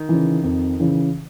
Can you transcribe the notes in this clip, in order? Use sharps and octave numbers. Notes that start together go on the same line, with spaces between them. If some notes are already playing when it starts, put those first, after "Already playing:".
Already playing: D#3
C#3 E3
F2
C#3 E3